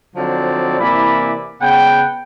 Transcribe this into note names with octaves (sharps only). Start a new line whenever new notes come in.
D3 F3 F#3 C4 D#4 D5
C3 E3 A#3 E4 D5 B5
C#3 B3 F#5 G5